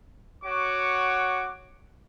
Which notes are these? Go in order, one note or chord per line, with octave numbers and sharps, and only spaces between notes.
F#4 C#5 F#5 C#6 D6